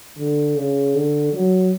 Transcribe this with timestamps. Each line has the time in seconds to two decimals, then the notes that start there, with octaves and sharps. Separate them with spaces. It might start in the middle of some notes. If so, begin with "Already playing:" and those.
0.18 D3
0.56 C#3
0.95 D3
1.33 F#3